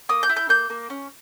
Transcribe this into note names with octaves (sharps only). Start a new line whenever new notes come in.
A#3 D#6
G6
E4
G6
A#3 G6
A#3
C#4